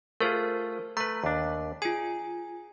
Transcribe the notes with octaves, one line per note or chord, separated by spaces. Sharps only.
A3 F4 G#4 A#4 C5
A3 B4 A#5
D#2 D4
F4 G#4 G#5